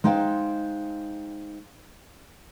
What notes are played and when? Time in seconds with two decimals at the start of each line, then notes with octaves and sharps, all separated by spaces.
0.04 G#3 D#4 C5 F5 G5